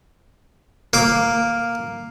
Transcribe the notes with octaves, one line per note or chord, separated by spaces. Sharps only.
A#3 D6